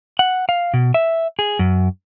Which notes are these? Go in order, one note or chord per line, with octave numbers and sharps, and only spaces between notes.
F#5
F5
B2
E5
G#4
F#2